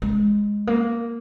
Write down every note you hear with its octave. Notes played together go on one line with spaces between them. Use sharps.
G#3
A#3